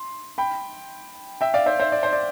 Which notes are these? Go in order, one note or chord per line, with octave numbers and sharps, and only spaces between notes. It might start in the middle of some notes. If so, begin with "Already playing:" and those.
Already playing: C6
G5 B5
E5 G5
D5 F5
C5 E5
C5 E5
D5
C5
D5